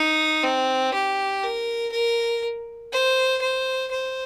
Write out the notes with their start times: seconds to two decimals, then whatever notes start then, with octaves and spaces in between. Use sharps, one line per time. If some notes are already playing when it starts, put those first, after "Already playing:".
Already playing: D#4
0.44 C4
0.93 G4
1.43 A#4
1.92 A#4
2.92 C5
3.42 C5
3.91 C5